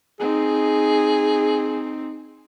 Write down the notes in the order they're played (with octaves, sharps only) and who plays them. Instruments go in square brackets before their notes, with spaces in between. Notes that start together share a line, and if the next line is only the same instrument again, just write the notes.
[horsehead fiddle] C4 D#4 [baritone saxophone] G#4